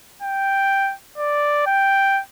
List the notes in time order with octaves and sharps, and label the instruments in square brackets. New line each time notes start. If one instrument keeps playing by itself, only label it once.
[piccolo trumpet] G5
D5
G5